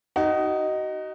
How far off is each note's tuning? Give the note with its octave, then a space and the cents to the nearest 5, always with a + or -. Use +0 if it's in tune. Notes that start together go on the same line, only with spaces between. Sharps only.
D#4 +0 F#4 +35